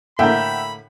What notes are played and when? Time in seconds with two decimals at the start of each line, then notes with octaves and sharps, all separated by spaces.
0.19 A2 D3 A#3 E5 F#5 G5 B5